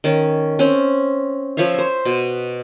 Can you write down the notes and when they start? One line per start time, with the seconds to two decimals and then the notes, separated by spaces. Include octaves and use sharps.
0.04 D#3 C#4
0.59 C4 C#4
1.57 F3 C#5 E5 F5
1.74 C5 E5
2.05 B2